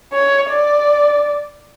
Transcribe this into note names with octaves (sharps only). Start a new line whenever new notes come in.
C#5
D5